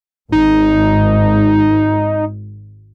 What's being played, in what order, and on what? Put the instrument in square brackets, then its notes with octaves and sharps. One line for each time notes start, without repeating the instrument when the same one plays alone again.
[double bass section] G#1 [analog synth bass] D#4